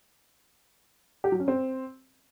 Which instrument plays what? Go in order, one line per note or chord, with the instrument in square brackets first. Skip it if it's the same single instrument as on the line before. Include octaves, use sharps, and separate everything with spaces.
[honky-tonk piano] G4
F#3
C#4
C4